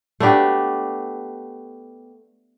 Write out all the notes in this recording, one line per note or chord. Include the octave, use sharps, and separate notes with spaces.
A3 B3 D4 G4